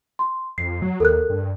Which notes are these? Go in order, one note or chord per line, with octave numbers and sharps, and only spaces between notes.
C6
F2 C7
F#3
D#2 A4 A#4 F#6
G2